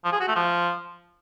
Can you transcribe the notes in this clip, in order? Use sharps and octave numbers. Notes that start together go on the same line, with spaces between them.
F3
G#4
F#4
A3
F3